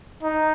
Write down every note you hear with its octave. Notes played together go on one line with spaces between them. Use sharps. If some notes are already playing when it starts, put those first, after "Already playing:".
D#4